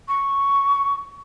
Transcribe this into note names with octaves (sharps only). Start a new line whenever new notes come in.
C#6